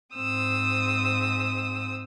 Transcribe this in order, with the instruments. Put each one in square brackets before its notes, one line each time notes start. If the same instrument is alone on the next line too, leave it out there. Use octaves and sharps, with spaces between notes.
[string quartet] G#2 C4 D#6 E6